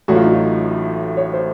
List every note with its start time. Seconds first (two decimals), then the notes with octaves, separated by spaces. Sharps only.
0.08 A1 A2 F#3 F#4
0.15 F4
0.24 D#4
0.32 F4
1.17 C#5
1.34 C5